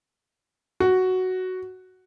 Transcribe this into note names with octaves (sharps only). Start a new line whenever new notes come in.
F#4